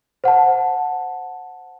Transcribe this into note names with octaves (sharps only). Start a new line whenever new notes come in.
C5 F#5 A5